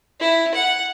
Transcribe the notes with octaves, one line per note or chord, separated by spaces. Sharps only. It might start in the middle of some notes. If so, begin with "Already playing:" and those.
E4
F#5